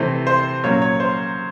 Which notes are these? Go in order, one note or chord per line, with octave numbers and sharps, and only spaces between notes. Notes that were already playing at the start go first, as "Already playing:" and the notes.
Already playing: C3 E3 A3 C4
C5
A#2 F#3 A#3 C#4 C#5
C#5
C5